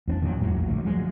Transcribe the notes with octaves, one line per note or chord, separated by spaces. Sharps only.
E2 B3 D4
D#2 A#2 D#3 F#3
E2 A2 E3 F#3
A#1 F#2
D2
F3 F#3 G#3